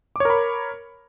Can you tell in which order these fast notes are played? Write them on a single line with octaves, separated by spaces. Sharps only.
D6 C#5 A#4 B5